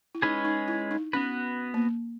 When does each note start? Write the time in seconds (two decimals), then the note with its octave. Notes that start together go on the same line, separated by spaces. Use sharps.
0.15 E4
0.22 G#3 C#4 D#4 G#4 B4
0.45 D#4
0.68 E4
0.91 D#4
1.13 B3 C#4 F#4 B4
1.74 A#3